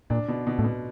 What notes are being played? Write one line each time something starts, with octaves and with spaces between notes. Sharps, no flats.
A#2 D4
B2
B2
A2
B2